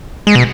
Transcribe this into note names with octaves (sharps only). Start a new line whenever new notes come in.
G#3
B2